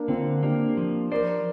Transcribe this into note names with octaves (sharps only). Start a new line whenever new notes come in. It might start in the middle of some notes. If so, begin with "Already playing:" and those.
Already playing: A#3 D4
D3 C4 F4
A#3 D4 G4
F3
A#4 C5 D5